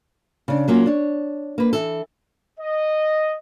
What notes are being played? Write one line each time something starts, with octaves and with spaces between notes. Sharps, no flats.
C#3 D4
F#3 A#3 C#4 F4
D4 C#5
A#3 B4
E3 A4
D#5